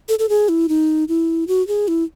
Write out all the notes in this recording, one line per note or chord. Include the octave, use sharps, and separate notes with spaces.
A4
A4
G#4
E4
D#4
E4
F#4
G#4
E4